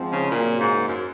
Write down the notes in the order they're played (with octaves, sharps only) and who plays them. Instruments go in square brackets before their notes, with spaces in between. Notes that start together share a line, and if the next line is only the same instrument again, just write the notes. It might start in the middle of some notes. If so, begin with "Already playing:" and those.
Already playing: [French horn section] G#2 F3 C4
[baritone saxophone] C#3
[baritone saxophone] A#2 [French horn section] C#3 F#3 A#3
[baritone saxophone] G#2
F#2